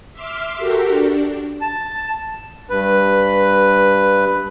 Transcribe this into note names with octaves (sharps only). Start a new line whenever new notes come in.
E5 C6 D6 F6
F#4 G4 A4 A#4
D4
A5
G2 B4